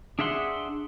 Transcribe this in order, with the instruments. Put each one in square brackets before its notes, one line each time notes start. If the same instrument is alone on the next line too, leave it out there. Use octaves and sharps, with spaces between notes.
[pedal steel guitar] D4 G#4 E5 F#5 C6